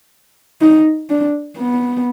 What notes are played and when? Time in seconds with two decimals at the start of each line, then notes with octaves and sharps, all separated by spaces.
0.62 D#4
1.10 D4
1.58 B3